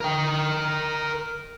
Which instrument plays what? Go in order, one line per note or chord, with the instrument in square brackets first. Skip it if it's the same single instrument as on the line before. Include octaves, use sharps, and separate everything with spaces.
[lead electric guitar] A#4 G5